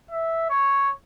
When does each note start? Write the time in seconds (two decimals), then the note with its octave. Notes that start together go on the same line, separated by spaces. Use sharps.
0.11 E5
0.50 C#5